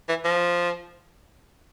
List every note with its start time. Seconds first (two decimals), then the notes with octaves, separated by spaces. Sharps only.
0.09 E3
0.25 F3